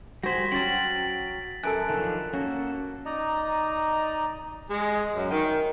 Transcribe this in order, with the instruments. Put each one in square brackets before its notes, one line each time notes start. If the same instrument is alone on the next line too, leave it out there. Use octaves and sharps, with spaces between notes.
[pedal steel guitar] G3 G#4 B5 [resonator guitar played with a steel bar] F#4 C5 [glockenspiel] A#6 B6
[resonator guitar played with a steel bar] F#3 C#4 [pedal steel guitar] G5 [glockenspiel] A6 F#7
[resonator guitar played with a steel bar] F#2 [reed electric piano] A4 A#4 G#5 [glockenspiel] F#6 D7
[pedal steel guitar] D#3 F3 D4
[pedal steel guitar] A#3 F#4 A4 [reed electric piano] C#4
[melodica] D#4 D5 D#5 A#5
[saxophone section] G#3
F#2
D#3